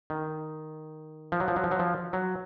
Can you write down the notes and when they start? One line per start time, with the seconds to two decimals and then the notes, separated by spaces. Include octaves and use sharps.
0.10 D#3
1.32 F3
1.40 F#3
1.48 F3
1.56 F#3
1.64 F3
1.71 F#3
1.79 F3
2.13 F#3